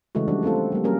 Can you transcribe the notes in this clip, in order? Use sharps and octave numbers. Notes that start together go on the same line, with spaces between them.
C#3 E3 G#3 A3 F#4
F3 G3 D4 F#4
A3 C4 F4 A4
A4
G3 A#3
F#3 G3 A#3 C#4 G#4 A#4